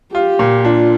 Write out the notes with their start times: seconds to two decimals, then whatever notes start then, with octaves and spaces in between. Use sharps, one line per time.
0.13 F4 G4
0.39 A#2
0.65 D4 F4